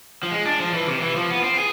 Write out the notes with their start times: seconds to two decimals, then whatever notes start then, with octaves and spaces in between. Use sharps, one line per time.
0.23 F3
0.31 G#3
0.45 D4
0.60 F3
0.74 E3
0.87 C3
1.01 E3
1.16 F3
1.30 B3
1.44 C4
1.57 G#4